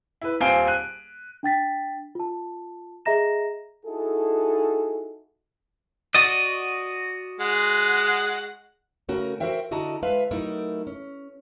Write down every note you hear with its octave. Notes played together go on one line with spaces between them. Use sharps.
E4 B4
D#1 C4 F5 G#5 D7 G7
F#6 D#7
D4 G5 A6 B6
F4 A5
G#4 D#5 E5 A#5 A#6 E7
D#4 E4 F#4 G#4 A4
F#4 D5 D#5
G#3 F#5
C#3 A3 C#4 F#4 A#4
F#4 G#4 A#4 C5 E5 G5
D3 E4 F#4 D#5 A5 A#5
G#3 B4 E5 F5
F#3 A3 D#4 E4 A#4
C#4